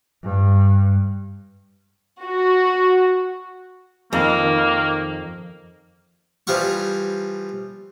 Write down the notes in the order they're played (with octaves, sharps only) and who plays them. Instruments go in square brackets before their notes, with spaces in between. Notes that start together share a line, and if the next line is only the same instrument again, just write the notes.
[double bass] G2
[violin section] F#4
[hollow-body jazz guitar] F2 [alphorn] D#3 [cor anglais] A#3
[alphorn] D#3
[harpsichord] E3 F3 G3 F5 C#6